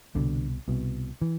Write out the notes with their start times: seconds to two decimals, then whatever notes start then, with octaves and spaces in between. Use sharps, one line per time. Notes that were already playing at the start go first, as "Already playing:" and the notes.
0.15 C2 B2 D3
0.68 C2 B2
1.22 E3